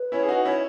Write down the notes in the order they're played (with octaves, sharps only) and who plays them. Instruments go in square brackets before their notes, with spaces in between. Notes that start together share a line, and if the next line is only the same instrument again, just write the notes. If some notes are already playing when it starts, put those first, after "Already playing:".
Already playing: [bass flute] B4
[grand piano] C#4 E4
G#4
D#4 F#4
C#4 E4